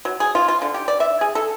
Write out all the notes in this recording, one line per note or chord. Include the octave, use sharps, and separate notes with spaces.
F#3
G#4
F4
F4
D3
G4
D5
E5
G#4
A4